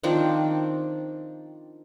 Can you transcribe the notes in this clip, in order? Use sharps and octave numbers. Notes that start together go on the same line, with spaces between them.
D#3 F3 C4 D4